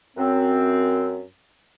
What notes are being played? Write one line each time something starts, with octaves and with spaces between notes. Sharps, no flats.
F#2 C4